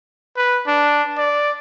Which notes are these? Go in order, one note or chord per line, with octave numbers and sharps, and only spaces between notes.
B4
D4
D5